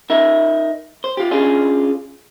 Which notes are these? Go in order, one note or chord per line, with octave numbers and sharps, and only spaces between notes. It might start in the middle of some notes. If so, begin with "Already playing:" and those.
D#4 A#4 E5
C5
F4 G4
C#4 D4 F4 G#4